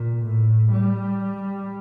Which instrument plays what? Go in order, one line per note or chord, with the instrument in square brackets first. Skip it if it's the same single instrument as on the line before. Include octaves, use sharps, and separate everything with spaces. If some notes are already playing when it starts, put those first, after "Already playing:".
Already playing: [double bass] A#2
A2
G3